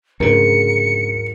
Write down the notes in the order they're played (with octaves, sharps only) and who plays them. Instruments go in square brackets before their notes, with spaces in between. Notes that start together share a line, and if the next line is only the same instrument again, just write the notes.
[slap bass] D2 C#3 [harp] G#2 F#3 [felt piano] A#4 [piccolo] C#7